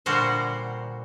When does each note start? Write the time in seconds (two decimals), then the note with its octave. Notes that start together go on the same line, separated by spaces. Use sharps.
0.06 A#2 D3 G3 A#3 F#4 C5